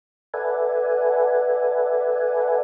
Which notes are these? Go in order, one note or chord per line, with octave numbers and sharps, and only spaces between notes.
A4 B4 D5 E5 F#5 G#5